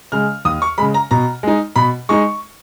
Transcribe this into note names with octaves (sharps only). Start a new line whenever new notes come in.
C#3 G#3 F6
D#2 D#6
C#6
C#3 G#3 B5
A#5
B2 A#5
G#3 D#4
B2 B5
G#3 D#4 C#6